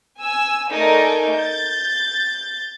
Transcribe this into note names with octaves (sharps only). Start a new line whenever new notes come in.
G#5 E6
A3 D#4 A4 A#4 D5 G#5
G6 A6